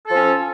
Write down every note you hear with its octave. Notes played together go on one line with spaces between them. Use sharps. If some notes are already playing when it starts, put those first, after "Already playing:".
F3 C#4 A4